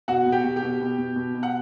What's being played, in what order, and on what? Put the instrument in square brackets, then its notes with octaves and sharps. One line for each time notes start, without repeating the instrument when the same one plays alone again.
[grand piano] B2 F#4 F#5
B2
G4 G5
B2
G4 G5
B2
B2
B2
B2
B2
F#5